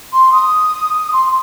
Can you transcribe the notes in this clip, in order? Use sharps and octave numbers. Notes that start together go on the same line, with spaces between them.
C6
D#6
C6